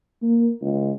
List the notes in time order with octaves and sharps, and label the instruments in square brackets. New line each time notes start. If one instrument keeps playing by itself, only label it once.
[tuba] A#3
C#2